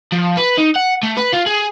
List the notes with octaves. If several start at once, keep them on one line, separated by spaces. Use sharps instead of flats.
F3
B4
D#4
F#5
A3
B4
F4
G#4